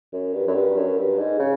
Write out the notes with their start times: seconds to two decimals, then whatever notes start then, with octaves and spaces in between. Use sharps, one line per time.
0.12 F#2
0.33 G2
0.47 F#2
0.55 G2
0.76 F#2
0.97 G2
1.18 G#2
1.39 C#3